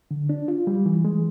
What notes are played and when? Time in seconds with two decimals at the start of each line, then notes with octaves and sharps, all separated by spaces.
0.11 D3
0.29 D4
0.48 F4
0.67 G3
0.86 E3
1.05 G#3